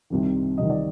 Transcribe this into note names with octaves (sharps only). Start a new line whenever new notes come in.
C2 C3 D#3
C2 C3 D#3 D#5
D5